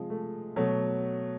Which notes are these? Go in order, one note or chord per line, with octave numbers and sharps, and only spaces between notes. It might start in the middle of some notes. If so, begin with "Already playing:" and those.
Already playing: C3 F3 G#3
A3
B2 F#3 A3